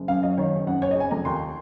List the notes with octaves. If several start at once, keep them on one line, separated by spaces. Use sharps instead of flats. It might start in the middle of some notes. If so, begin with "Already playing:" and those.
Already playing: F#1
F#2 F5
F#3 D#5
D#3 C#5
F#1
F#2 F#5
F#1 C#5
D#5
C#3 G#5
F1 A#5
D#2 C6